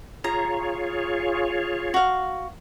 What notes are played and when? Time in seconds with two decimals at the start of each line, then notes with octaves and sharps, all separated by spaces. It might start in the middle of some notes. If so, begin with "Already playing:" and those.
0.24 F4 G#4 C#5 A#5
1.94 F#4 F5